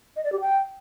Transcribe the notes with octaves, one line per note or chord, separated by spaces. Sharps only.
D#5
D5
G4
G5